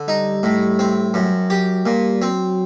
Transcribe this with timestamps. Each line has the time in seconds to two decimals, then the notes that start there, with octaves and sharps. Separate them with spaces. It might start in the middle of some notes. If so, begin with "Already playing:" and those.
Already playing: D3
0.08 G3 D#4
0.43 A2
0.79 C4
1.14 F#2
1.50 F#3 G4
1.85 A#2 G3
2.21 F#3 C4